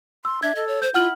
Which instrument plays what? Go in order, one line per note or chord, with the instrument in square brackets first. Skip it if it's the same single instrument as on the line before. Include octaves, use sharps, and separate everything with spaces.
[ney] C6 [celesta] E6
[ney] D4 [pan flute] E5 [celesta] G#6
[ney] A4 [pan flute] D#5
[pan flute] C#5
[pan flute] C5 [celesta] G6
[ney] E4 [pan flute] F4 [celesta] F#5 F6 F#7